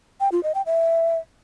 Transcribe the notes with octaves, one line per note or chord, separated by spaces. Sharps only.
G5
F4
D#5
G5
E5